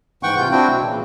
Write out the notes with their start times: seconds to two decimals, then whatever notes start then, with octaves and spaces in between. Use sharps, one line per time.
0.23 G#2 E3 F#5 G5 C#6
0.37 C3 F4 G6
0.51 C4 D4 E4 F#4 G5
0.69 B2
0.82 A#2 C#3 E3